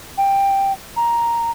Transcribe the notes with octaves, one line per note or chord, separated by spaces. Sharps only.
G5
A#5